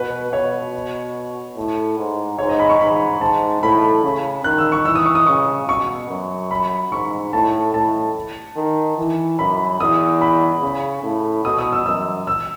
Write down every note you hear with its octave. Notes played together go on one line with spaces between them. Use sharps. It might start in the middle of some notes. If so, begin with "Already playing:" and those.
Already playing: B2 B4
B2 C#5
A2
G#2
G#2 C#5
D#5
B5
C#6
G#2 B5
G#2 A5
A2 B5
C#3
D#3 F#6
E6
C#6
E3 E6
D#6
C#6
D#6
C#3 C#6
B2 C#6
F#2
B5
G#2 C#6
A2 A5
A2 A5
D#3
E3
F#2 B5
E2 D#6
B5
C#3
A2
B2 D#6
D#6
E6
F#2 E6
E6